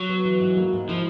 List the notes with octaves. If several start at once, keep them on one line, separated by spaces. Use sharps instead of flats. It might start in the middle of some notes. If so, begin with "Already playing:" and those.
Already playing: F#3
B3
E3
G#2
A#3
G#2
F3 E4